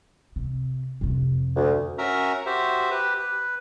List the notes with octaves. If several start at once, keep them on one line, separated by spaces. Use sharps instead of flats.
C3
F2 C3
D2
C#4 F#4 A#4 E5 A#5
F#4 G4 C5 E5
G4 B4
B4